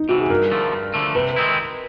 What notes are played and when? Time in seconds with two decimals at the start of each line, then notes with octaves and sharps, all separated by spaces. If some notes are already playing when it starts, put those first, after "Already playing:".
Already playing: D#4
0.09 C3 E3 F#4
0.20 G#4
0.30 G2 A#4
0.52 D3 F3 A3
0.72 G2
0.94 D3 F3 A3
1.15 C3 B4
1.36 D#3 G#3 C4 E4